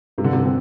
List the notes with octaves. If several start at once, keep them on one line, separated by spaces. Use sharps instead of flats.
G2 C3
D3
C3
C4